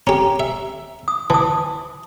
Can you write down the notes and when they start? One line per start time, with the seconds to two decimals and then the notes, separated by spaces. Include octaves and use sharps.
0.07 C#4 G4 A#5
0.40 E5
1.08 D#6
1.30 E3 A5 D#6